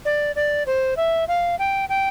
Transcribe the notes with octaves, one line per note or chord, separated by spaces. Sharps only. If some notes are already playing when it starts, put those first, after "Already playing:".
D5
D5
C5
E5
F5
G5
G5